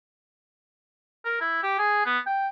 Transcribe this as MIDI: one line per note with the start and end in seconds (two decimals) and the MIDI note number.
1.25 1.37 70
1.41 1.60 64
1.63 1.77 67
1.79 2.02 68
2.06 2.19 59
2.26 2.48 79